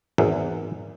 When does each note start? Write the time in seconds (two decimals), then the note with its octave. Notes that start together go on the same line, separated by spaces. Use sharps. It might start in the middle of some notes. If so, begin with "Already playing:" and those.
0.18 G#1 E2